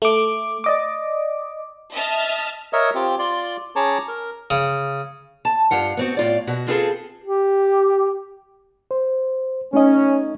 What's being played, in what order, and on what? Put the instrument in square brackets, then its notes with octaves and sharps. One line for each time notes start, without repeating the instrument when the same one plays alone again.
[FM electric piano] A3 D6
D5 D#5 D6
[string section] D#5 E5 A5 F6
[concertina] A#4 C#5 D#5 E5
C4 F4 G4
F4 D5 C6
C#4 G#4 C#5 A5 A#5 D6
A#4
[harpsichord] C#3
[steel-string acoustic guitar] A5
G2 F4 F#5
B3 C4 F#4
A2 F4 D5
B2 F#4
C4 F4 G#4 A4 B4
[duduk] G4
[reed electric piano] C5
[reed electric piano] A3 D#4 D#5 [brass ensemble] C#4